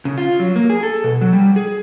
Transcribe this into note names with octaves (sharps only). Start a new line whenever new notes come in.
C#3
F4
F#3
A#3
G#4
A4
B2
F#3
G3
G#4